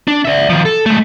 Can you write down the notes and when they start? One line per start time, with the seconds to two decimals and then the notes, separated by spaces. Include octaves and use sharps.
0.08 D4
0.25 D5 E5
0.50 D#3 F3
0.65 A4
0.86 G#3 A3